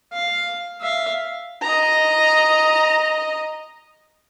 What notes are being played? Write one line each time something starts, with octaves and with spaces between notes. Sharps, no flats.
F5
E5 F5
D#5 A#5